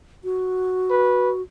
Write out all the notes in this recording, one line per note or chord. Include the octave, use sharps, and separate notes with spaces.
F#4
B4